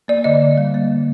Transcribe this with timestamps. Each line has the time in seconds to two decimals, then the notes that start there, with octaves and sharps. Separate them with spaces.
0.08 A#3 D5
0.24 D3 D#5
0.42 D3
0.57 G3
0.74 A#3
0.91 D3